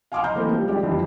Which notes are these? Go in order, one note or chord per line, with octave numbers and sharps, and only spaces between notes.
F5 G#5 C6 D6 D#6 F6
D#5 A#5 C6 F6 G6
E3 A3 A#3 C4
F3 G3
G#3 G4 D5
F2 D#3 E3 G3